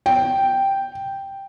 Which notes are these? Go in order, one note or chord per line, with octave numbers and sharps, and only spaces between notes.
G5